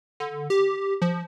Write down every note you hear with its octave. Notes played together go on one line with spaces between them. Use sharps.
D3
G4
F3